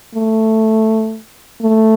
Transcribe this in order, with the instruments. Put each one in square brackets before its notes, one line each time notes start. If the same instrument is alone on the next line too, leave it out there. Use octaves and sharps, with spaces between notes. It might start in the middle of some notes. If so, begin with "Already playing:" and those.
[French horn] A3
A3